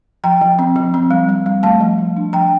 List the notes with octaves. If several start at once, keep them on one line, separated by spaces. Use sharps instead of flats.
F3 G5 A#5
F3
C4
F3
C4
G3
G3
G3
A3 F5 A5
F3
F3
D4
F3 G5 A#5